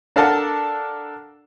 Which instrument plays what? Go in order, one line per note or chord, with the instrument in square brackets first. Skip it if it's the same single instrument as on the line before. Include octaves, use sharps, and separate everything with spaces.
[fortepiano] D4 A4 A#4 F5 F#5 A5